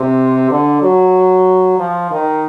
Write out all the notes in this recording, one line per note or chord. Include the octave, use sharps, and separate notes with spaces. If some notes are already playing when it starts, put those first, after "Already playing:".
Already playing: C3
D3
F#3
F3
D#3